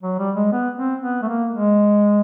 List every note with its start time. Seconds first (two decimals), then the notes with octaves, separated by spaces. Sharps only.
0.03 F#3
0.19 G3
0.35 G#3
0.52 B3
0.77 C4
1.02 B3
1.22 A3
1.28 A#3
1.53 G#3